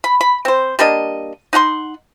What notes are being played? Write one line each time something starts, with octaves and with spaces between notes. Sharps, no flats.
B5
B5
C4 C5
G3 A#3 D4 D#5
D#4 F#5 A#5 C6